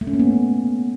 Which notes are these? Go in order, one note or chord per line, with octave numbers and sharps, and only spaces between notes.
A3
C#4
A#3
B3